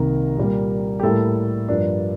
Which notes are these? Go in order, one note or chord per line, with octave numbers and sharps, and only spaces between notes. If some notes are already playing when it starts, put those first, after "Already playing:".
Already playing: C2 C3 D#3 A#3 A#4
A#2 G3 A#3
G4
A2 G3 A#3 A4
G2 F3 A#3 D4